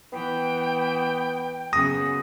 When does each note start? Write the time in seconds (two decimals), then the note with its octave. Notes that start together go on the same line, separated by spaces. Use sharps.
0.12 E3 B3 G5
1.73 F#2 C#3 B3 D#6 A#6